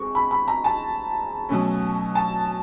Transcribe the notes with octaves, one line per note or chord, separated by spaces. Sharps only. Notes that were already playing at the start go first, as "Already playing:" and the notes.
Already playing: G#3 C4 C#6
B5
B5
A#5
A5
B2 F#3 A3 C#4
A5